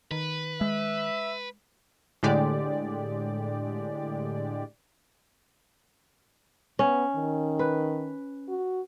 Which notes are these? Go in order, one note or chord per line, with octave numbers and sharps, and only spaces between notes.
D#3 B4
G#3 E5
A2 D3 G#3 G4 D5
B3 C#4
D#3
B4
F#4